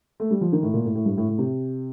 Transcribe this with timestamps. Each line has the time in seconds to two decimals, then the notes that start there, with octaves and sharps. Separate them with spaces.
0.20 A3
0.31 G3
0.41 F3
0.52 D#3
0.63 A2
0.74 A#2
0.85 A2
0.95 A2
1.06 G2
1.18 A2
1.29 A2
1.38 C3